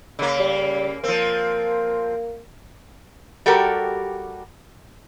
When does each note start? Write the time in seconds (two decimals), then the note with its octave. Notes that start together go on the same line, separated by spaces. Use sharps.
0.19 C#3 A#3
0.39 G3
1.04 F3 A#3 C4
3.46 G3 F#4 G4 A4 A#4